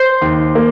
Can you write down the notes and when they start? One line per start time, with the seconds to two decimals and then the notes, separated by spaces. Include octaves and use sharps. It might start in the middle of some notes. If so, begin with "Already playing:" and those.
Already playing: C5
0.22 D#2
0.55 A#3